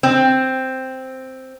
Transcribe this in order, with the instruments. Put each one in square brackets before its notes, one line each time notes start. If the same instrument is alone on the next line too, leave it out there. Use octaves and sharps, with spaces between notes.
[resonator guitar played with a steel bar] C4